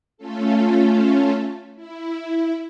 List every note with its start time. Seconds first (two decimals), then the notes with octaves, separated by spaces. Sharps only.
0.17 A3 C#4 F4 A4
1.75 E4